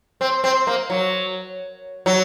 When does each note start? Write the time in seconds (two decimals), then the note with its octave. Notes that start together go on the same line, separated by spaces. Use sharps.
0.21 C4
0.44 C4
0.67 A#3
0.90 F#3
2.06 F#3